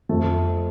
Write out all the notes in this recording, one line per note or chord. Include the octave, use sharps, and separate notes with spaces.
F2 F3 A3